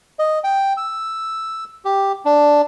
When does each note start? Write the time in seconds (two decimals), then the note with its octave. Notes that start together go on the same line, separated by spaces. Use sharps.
0.19 D#5
0.44 G5
0.77 E6
1.85 G4
2.25 D4